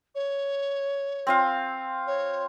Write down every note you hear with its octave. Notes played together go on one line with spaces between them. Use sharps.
C#5
C4 F4 F5
C#5